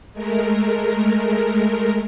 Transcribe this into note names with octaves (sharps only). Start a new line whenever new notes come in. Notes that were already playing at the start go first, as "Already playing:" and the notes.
G#3 A3 A#4